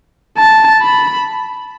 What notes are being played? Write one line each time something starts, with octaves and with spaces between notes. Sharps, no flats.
A5
B5